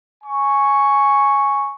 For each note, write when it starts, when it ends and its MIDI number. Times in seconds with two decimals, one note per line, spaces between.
0.24 1.73 80
0.24 1.73 85